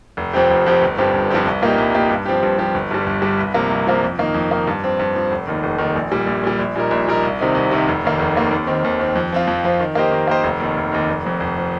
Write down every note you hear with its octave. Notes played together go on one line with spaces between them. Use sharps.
F1
F2 F3 C4 G4
F1
F2 F3 C4 G4
G1
G2 F3 C4 G4
G1
G2 F3 C4 G4
C2
A#2 A#3 D#4 G4
C2
A#2 A#3 D#4 G4
G2
F3 C4 G4
G2
F3 C4 G4
G1
G2 G3
G1
G2 G3
C2
C3 F3 A#3
C2
C3 F3 A#3
F2
D#3 A#3 D#4
F2
D#3 A#3 D#4
G2
F3 C4
G2
F3 C4
F1
D#2 D#3
F1
D#2 D#3
A#1
A#2 G3
A#1
A#2 G3
A#1
A#2 G3 D#4 A#4
A#1
A#2 G3 D#4 A#4
C2
C3 D#3 C4 D#4
C2
C3 D#3 C4 D#4
F1
D#2 D#3 A#3
F1
D#2 D#3 A#3
D#2
D#3 C4
D#2
D#3 C4
F2
F3 C4 F4
F2
F3 C4 F4
D#3
A#3 G4 C5 D#5
D#3
A#3 G4 C5 D#5
F1
D#2 D#3
F1
D#2 D#3
F1
F2 F3
F1
F3